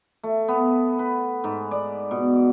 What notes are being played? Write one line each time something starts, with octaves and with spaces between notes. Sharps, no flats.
A3
B3
B4
G#2
D5
B2